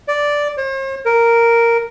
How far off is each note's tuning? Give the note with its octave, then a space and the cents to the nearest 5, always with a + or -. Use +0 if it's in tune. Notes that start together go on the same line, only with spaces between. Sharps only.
D5 -5
C5 +45
A#4 -5